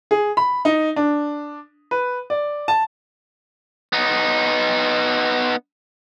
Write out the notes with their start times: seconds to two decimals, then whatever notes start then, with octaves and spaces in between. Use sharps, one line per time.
0.11 G#4
0.37 B5
0.65 D#4
0.96 D4
1.91 B4
2.30 D5
2.68 A5
3.93 B3 D#4